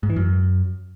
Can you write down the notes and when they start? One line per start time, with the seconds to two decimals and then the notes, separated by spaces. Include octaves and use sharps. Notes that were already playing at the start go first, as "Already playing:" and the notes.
0.03 G#2
0.10 E3
0.16 F#2